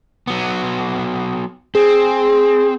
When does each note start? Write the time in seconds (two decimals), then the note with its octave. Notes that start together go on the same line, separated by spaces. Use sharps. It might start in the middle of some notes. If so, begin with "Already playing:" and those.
0.27 F#3 B3
1.75 C4 G#4